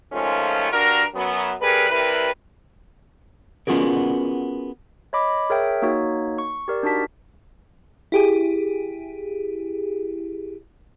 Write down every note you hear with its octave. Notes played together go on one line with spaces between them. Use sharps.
D#3 F3 G#3 A3 C#4 F4
G2 D4 F#4 A#4
F#2 F#3 B3
C3 G3 G#4 A#4 B4
C3 G3 E4 A#4 B4
B3 C#4 F4 F#4 G#4 A#4
C#5 D#5 B5 D6
G#4 A#4 C#5 E5 G5
A#3 D#4 F#4 C#5
C#6
G4 A#4 D5
D4 D#4 F#4 A5 B6
E4 G4 G#4